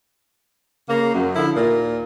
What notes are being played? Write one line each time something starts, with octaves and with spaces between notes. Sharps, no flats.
C#3 A#3
F#2
D3 F3 E4
D#2 A#2